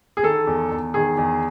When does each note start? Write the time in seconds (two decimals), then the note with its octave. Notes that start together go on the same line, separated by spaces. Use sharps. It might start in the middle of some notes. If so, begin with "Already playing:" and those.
0.17 G#4
0.23 D#3 A4
0.47 E2
0.71 E2
0.94 D#3 G#4
1.17 E2